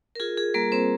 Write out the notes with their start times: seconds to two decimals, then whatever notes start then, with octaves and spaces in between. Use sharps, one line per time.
0.15 A#4
0.20 F4 G#4
0.37 G#4
0.54 G3 A#3 A#4
0.72 C4 C5